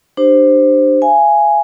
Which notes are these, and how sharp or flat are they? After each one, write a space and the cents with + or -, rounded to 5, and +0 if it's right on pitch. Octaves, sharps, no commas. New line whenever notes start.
D4 +25 G4 +0 C5 +0
F5 -40 G#5 +0